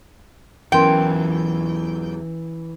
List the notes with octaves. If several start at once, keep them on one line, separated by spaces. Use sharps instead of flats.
E2 E3 F#3 C#4 A#4 G5 C6